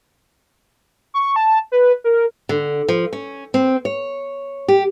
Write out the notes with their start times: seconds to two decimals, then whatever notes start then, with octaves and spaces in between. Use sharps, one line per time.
1.14 C#6
1.36 A5
1.72 B4
2.04 A#4
2.49 D3
2.89 F3
3.13 C#4
3.54 C4
3.85 C#5
4.68 G4